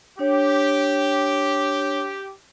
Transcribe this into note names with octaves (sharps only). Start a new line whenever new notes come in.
D4 G4 C#5